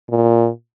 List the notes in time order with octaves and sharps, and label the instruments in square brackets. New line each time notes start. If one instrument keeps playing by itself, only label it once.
[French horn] A#2